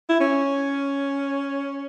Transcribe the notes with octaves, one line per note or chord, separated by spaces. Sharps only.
E4
C#4